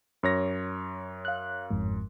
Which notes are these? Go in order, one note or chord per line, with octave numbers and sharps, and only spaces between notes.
F#2 C#5 A#6
F5 F#6
G1 F2 G#2